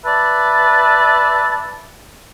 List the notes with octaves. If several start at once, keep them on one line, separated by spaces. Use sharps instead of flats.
B4 D5 E5 A5